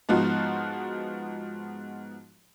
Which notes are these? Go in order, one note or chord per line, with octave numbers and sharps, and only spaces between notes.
G#2 F3 B3 D#4 F4 F#4